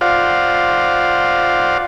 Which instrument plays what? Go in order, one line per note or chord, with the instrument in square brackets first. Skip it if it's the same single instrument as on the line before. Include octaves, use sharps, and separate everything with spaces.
[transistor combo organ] F4 C5 D5 F5 F#5